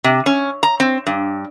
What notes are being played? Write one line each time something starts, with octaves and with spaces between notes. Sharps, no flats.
C3
C#4
A#5
C4
G2